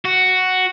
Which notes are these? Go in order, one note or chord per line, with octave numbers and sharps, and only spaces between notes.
F#4